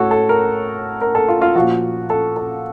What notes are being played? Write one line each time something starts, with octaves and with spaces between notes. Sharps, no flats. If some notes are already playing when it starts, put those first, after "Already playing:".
Already playing: A2 F#4 A4 C#5
A4
A#4
A#4
A4
F4
F4
A#2 F3 F#4
A4
A4